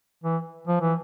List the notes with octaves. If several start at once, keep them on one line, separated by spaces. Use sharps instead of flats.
E3
F3
E3